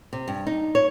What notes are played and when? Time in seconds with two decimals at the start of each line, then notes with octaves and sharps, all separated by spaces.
0.13 C3
0.28 G2
0.47 D#4
0.75 C#5